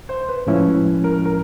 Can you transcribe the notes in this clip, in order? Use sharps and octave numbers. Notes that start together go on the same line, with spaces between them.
C5
B4
A2 F3 G#3 C#4 E4
A#4
A#4